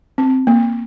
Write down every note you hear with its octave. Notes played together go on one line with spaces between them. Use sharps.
C4
A#3